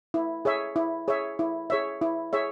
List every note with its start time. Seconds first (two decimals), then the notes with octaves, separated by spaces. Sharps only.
0.14 E4
0.45 G#4 C#5 E5
0.76 E4
1.08 G#4 C#5 E5
1.39 E4
1.70 G#4 C#5 E5
2.02 E4
2.33 G#4 C#5 E5